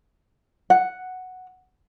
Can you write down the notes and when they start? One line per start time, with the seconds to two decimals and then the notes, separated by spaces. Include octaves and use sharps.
0.70 F#5